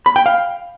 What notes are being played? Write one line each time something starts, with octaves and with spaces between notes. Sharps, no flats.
B5
G5
F5